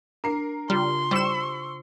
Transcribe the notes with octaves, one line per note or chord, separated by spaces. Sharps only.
D4 A#4 C7
C#3 G3 F4 C6
G3 C5 C#6 E6 C#7 E7